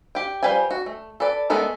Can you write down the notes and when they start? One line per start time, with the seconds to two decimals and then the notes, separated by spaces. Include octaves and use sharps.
0.15 G4 G5
0.43 F3 G3 B4 G5 G#5
0.71 F#4
0.86 A3
1.20 A4 B4 D5
1.50 G#3 A3 B3 A4 A#4